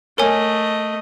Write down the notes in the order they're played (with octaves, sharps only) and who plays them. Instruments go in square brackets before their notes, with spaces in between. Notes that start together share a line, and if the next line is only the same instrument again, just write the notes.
[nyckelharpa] A3 D#5 [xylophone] A#4 C#5 G#5